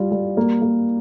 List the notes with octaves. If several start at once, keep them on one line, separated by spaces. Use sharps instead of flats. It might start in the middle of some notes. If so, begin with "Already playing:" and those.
Already playing: G3 F4
G3
A#3
A#3